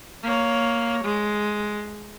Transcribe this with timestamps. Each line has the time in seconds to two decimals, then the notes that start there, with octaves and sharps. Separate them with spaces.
0.23 A#3 C#5
1.04 G#3